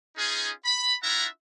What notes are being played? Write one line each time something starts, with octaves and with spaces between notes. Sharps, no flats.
C#4 D#4 F4 G#4
B5
D4 E4 F4 E5 F#5 A#5